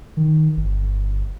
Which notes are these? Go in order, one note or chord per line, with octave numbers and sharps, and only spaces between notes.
D#3
G1